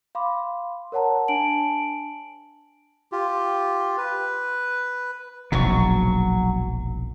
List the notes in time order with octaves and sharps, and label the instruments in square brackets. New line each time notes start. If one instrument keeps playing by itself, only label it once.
[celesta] F5 B5 C6 D6
A#4 C#5 F#5 A5 A#5
D4 G#5 A5 D7 F#7
[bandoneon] F4 G4
B4
[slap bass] E1 A#1 G#2 [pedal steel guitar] F#3 C#6